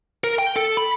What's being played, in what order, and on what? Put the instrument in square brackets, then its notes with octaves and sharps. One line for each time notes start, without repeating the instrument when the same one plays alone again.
[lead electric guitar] A#4
G5
A4
B5